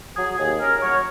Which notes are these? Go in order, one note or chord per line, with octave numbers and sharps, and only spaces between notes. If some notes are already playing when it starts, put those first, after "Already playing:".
F#3 G#4
D#2 G#4
C#4 A#4
F#3 C#5